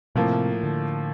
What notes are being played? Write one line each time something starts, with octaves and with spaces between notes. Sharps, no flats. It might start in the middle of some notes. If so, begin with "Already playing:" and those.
A2 C3 F3 A#3
D3